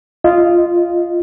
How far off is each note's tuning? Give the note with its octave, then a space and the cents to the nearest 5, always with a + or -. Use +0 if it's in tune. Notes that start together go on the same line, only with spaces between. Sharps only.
F4 -10 D#5 +0